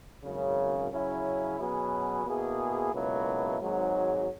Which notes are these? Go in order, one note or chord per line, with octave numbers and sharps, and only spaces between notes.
G#1 F#2 C#3
C#3 F#3 C#4 E4
B2 F#3 C#4 G#4 B4
B2 A#3 E4 G#4
C#2 B2 F#3 A#3 E4
G#1 G#2 F#3